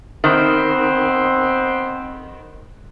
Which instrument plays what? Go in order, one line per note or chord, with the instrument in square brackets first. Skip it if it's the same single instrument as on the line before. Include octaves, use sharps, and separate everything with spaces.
[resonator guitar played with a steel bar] D#3 [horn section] B3 C4